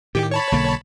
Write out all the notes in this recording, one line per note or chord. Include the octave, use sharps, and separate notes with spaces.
A2 D#3 G4
C#5 A5 B5
B1 D3 A#3